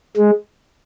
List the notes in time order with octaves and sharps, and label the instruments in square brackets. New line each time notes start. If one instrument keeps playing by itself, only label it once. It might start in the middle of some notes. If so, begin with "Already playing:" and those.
[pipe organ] G#3